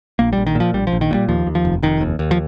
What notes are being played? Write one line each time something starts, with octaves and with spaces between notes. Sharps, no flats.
A#1 A#3
A#1 G3
D#3
A#2 F3
A#1 G3
F3
A#1
D#3
A#2 G3
D#2 F3
D#2
F3
F1
F1 D#3
D#2
D#2
F3